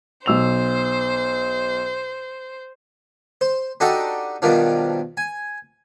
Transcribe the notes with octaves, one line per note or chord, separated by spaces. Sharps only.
B1 C5 E6 F7
C5
D4 D#4 F#4 G4 A4 D#5
G2 B2 D#3 F3 D4
G#5